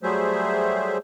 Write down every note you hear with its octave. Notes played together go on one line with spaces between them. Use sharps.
F#3 G3 A3 G#4 C5 E5